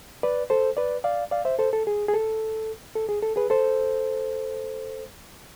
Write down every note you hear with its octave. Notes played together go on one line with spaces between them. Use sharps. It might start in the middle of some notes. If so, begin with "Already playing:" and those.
B4 D5
A4 C5
B4 D5
D5 F5
D5 F5
C5 E5
A4 C5
A4
G#4
G#4
A4
A4
G#4
A4
G#4 B4
A4 C5